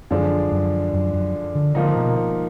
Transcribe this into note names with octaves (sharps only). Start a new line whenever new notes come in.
F#2 D3 F3 G#3 D4
F#2
F#2
F#2
D3
G#2 D3 F3 A#3 D#4
B2